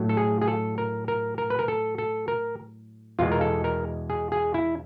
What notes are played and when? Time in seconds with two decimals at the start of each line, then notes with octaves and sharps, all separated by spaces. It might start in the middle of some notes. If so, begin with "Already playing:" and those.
Already playing: A2 F#3 A3
0.09 A4
0.17 G#4
0.42 G#4
0.48 A4
0.78 A#4
1.08 A#4
1.38 A#4
1.50 B4
1.59 A#4
1.68 A4
1.98 A4
2.28 A#4
3.19 E2 B2 G#3 F4
3.32 A#4
3.41 A4
3.64 A#4
4.10 G#4
4.32 G#4
4.54 E4